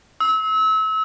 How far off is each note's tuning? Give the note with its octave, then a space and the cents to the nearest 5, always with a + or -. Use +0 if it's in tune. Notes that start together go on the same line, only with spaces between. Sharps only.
E6 -30